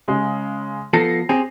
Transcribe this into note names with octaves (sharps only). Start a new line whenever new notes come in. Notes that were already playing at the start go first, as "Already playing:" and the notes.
C#3 G#3
F3 B3 A4 A#6 C7
C4 G4 G#4